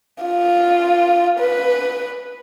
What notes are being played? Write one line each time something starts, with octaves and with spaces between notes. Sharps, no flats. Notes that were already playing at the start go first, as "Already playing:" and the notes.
F4
B4